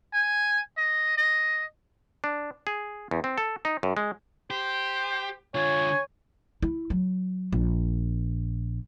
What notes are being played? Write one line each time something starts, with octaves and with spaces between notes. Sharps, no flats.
G#5
D#5
D#5
D4
G#4
E2
C4
A4
D#4
F#2
G#3
G4 C5
D3 F4 C#5 G#5
E4
F#3
A#1